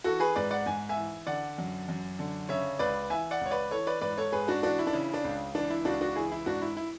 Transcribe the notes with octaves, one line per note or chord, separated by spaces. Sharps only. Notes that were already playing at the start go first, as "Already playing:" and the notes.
E3 F#4 A4
G#4 B4
G#2 B4 D5
D5 F#5
G#2 G#5
E5 G#5
E3
D3 D5 F#5
F#2
F#2
D3
C#3 C#5 E5
C#2 B4 D5
E3 E5 G#5
D5 F#5
C#2 C#5
B4 D5
E3 A4 C#5
B4 D5
G#2 B4 D5
A4 C#5
G#2 G#4 B4
D4 F#4
E3 D4 F#4
E4
D4
C#3 E4
D4
C#2
E3 D4
E4
C#2 D4 F#4
D4 F#4
E3 E4 G#4
E4
G#2 D4 F#4
E4
E4